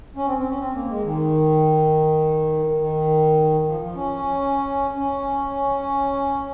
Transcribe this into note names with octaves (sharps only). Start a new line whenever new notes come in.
C#4
C4
C4
C#4
C4
A#3
G#3
D#3
D#3
F3
F3
C#4
C#4